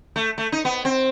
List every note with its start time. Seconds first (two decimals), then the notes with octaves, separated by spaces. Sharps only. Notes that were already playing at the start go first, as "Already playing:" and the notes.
0.16 A3
0.38 A3
0.52 D#4
0.65 B3
0.85 C4